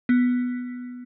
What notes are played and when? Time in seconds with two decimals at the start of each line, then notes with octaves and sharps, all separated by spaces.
0.09 B3